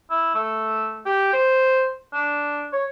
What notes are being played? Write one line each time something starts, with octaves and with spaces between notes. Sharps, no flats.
E4
A3
G4
C5
D4
C#5